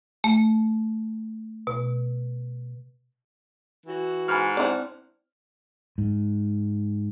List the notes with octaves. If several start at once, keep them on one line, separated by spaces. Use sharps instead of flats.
A3
B2
E3 F#4
G#2 G#5 B5 F6
C4 D4 E4 D5 F#5
G#2